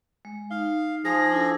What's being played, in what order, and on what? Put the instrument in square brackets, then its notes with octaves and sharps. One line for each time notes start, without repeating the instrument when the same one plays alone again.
[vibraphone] G#3
[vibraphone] D#4 [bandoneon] F5
[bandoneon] F3 G#4 [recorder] A#6
[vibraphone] D4 E4 A4